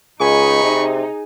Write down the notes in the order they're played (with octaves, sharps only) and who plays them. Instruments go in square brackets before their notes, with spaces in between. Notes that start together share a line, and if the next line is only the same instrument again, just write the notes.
[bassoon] C#2 [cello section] D#4 [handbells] G#4 G#5 [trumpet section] B5 C#6
[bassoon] C3